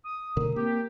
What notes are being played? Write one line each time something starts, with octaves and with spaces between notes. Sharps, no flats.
D#6
D2 B2 D3 A#4
A#3 C4 G4